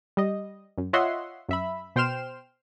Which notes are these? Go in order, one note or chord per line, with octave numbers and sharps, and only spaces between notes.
G3 D#5
F#2
F4 C#5 D#5 E5 F#5 C6
F#2 E5 B5
B2 C5 G5 C6 F6 E7